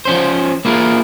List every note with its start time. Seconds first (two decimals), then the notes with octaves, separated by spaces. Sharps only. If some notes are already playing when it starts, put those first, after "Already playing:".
0.05 F3 C#4 C5
0.65 A#3 E4 F4 G#4 A#4